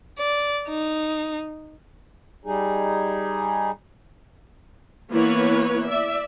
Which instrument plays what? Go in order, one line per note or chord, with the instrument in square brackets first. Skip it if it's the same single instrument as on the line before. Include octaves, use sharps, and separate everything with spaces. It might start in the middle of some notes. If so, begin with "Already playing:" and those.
[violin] D5
D#4
[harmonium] G3 D#4 G#4
[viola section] E3 A#3 B3 E4 B4 C#5
D5 E5